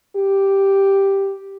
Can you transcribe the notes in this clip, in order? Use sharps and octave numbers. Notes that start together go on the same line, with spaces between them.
G4